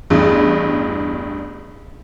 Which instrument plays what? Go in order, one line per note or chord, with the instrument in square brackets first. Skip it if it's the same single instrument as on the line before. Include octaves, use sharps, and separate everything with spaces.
[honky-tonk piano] A1 E2 G2